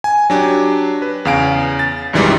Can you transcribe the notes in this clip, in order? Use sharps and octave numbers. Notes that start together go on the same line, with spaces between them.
G#5
F#3 D4 G4
B4
E2 C#3 F5 G#5 D7
A6
B1 F#2 D#3 E3 G3 G#3